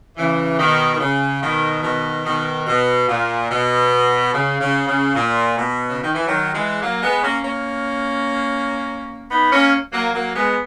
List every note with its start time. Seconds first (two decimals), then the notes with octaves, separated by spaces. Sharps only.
0.17 C#3 E3
0.59 B2 D#3
0.94 D#3
1.00 C#3
1.42 B2 D#3
1.83 B2 D#3
2.25 B2 D#3
2.66 B2
3.08 A#2
3.50 B2
4.33 C#3
4.60 C#3
4.87 C#3
5.15 A#2
5.57 B2
5.89 C#3
6.02 D#3
6.14 E3
6.26 D#3 F#3
6.53 E3 G#3
6.81 F#3 A#3
7.02 G#3 B3
7.23 A#3 C#4
7.44 A#3 C#4
9.30 B3 D#4
9.51 A#3 C#4
9.92 F#3 A#3
10.13 F#3 A#3
10.34 G#3 B3